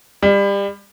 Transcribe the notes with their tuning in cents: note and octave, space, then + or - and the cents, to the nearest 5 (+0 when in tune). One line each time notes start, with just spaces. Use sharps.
G3 +30